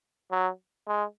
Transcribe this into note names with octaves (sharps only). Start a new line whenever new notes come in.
F#3
G#3